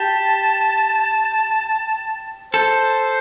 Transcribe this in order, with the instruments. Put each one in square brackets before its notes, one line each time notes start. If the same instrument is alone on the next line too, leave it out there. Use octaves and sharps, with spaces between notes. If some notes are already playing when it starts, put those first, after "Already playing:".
Already playing: [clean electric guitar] G4 [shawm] A5
[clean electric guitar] A4 [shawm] C5